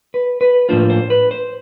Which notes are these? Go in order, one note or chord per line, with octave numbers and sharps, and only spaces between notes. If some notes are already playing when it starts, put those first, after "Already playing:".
B4
B4
A2 F3 A#3 D4 F4 C5
C5
B4
C5